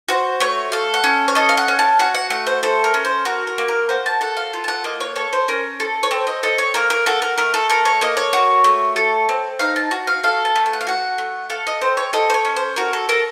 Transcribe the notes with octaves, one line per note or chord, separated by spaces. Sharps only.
F#4 C5
A3 C#5
A4 F5
F#5
C#4
C#5
A4 D#5
F5
F#5
C#4
A5
F#4 F#5
F#5
A3 F#5
C5
A4 C5
A#4
C#4
C5
F#4 A#4
A#4
A#3
A#4
F#4 C5
A5
A4 F#5
F5
F4
A5
F#5
A#3 D#5
C#5
A4 C#5
C5
C#4 A#4
A4
C#5
C4 C5
D#5
A4 D#5
C#5
A#3 A#4
A#4
F#4 A4
A#4
A3 A#4
A4
A4 A#4
C#5
A#3 D#5
C#5
F#4
A3
A4
C4
D#4 F5
A5
F#4
F5
A4 F5
A5
A3
A5
F#5
F5
F#4 F#5
A3
A4 F5
D#5
C4 C5
C#5
A4 D#5
C5
C#5
C#4
C5
F#4 A#4
A4
A4 A#4